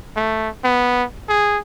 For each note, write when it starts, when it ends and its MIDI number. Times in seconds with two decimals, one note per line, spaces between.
0.16 0.49 57
0.64 1.04 59
1.29 1.58 68